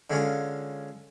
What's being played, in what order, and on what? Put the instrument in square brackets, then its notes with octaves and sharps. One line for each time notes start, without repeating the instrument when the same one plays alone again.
[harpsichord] D3 G#3 C#4 F4